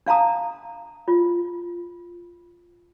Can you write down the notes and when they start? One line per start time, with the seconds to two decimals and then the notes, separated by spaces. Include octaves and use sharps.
0.06 D4 F5 A5 A#5 D#6
1.08 F4